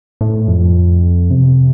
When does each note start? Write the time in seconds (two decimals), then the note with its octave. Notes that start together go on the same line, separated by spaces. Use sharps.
0.21 A2
0.48 F2
1.31 C3